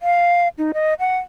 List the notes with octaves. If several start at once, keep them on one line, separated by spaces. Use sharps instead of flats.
F5
D#4
D#5
F#5